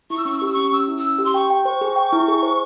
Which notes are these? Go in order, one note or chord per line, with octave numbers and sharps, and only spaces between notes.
E4 C#6
E6
C#4 C#6
E6
C#6
G4 E6
C#4 C#6
C#4 E6
E4
E6
C#4
G4
C6
G5 C#6
G5
C5 C#6
G#4
G5
E4
G#4
C5